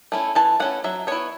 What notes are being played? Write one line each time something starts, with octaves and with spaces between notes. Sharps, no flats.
A3 C#4 E4
E3 A5
A3 C#4 E4 F#5
F#3 E5
B3 E4 C#5